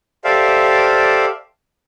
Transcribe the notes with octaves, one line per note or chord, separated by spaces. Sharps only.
G4 A4 C5 D5 E5 F5